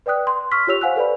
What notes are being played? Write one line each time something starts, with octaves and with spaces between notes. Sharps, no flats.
B4 D5 G5 D#6 F#6
C6
C#6 E6 F6 B6
F4 G4 C#5 E6 F7
C5 F5 F#5 G#5 E6 F#6
A4 B4 D5 B5